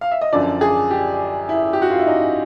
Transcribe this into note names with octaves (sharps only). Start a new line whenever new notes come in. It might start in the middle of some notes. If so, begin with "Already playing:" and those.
F5
E5
D#5
F#2 D3 F3 D5
G#4
G4
E4
G4
F#4
F4
E4
D#4